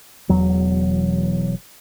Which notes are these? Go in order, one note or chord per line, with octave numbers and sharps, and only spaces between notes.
E1 E2 F#3